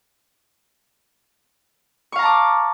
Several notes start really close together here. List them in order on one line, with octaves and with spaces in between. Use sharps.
C#6 F5 A#5 A5 D6